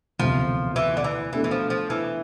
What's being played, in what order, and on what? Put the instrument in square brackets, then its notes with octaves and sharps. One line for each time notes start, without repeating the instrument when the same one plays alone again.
[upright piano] E1 D2 C3 [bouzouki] F3
[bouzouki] E3
D3
E3
[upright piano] B2 A3 D4 A4 [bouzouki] E3
[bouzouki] E3
F3
F3
E3